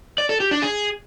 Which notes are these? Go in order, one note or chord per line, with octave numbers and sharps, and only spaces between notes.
D5
A4
G4
D4
G#4